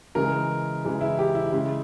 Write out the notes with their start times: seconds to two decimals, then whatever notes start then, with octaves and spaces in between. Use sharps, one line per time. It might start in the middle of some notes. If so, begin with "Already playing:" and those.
0.15 C#3 E3 G#3 A#4
0.84 C#3 E3 G#3
1.01 E4
1.19 G4
1.35 E4
1.52 C#3 G#3